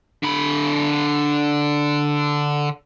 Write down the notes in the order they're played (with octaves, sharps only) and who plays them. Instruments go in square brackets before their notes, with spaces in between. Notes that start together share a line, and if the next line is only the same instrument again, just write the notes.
[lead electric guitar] D3 B5